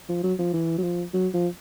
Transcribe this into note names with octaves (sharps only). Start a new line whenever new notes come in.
F3
F#3
F3
E3
F#3
F3
F#3
F3